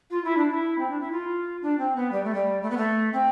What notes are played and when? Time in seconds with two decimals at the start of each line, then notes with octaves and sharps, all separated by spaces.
0.10 F4
0.24 E4
0.37 D4
0.50 E4
0.78 C4
0.89 D4
1.00 E4
1.11 F4
1.62 D4
1.78 C4
1.96 B3
2.11 G3
2.24 A3
2.34 G3
2.62 A3
2.70 B3
2.77 A3
3.13 C4